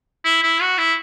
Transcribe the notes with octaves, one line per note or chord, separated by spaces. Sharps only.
E4
E4
F#4
E4